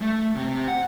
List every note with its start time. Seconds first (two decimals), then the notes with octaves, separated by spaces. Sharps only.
0.01 A3
0.36 C3
0.68 F#5